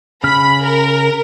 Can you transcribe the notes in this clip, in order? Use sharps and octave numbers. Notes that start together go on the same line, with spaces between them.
C#3 B5 F6
A#4